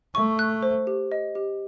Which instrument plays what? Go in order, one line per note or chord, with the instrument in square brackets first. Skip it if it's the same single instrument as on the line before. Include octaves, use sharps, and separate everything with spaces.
[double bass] A3 [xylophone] C#6
[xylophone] F#6
C5
G4
D#5
G4